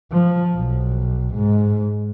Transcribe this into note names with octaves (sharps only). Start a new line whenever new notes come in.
F3
B1
G#2